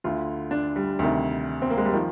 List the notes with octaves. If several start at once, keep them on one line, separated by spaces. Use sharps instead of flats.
D2 D3 F4
D4
G3
D2 C3 D#3
C4
A#3
G#3
G3
D#3 F3